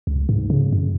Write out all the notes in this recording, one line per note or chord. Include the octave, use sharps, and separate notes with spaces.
C#2
G#2
C#3
F#2